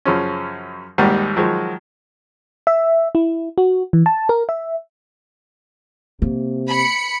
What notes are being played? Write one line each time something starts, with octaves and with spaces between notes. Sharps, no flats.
F#2 C#3 F3 C#4
G#1 D#2 G#2 D#3 G3 F#5
D#3 F3 F#3 G#3 F#4
E5
E4
F#4
E3
A5
A#4
E5
C3 A#3
B5 C#7